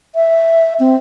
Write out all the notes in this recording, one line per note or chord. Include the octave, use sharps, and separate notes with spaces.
E5
C4